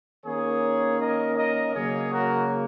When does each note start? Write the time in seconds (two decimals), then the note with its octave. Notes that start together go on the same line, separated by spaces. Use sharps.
0.24 D#3 A#3 C#4 G#4 C#5
0.99 A#4 D#5
1.36 A#4 D#5
1.73 C#3 F#3 A#3 G#4 C#5
2.10 F#4 A#4